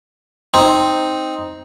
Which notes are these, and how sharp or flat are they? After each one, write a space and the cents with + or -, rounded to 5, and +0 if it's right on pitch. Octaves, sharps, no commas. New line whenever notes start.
C4 +0 D#4 +5